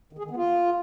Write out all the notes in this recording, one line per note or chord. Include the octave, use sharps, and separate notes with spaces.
D#3
G#4
D#3
B3
F4